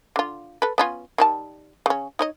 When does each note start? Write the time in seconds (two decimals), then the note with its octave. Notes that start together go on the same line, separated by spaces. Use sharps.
0.16 D3 F4
0.62 A4 B4
0.78 B3 C#4 F4
1.18 D#3 G3 A5
1.86 C#3 C#4
2.19 D#4 C#5 D#5